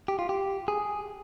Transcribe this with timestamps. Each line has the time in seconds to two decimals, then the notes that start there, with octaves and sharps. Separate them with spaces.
0.08 G4
0.19 F4
0.29 G4
0.68 G#4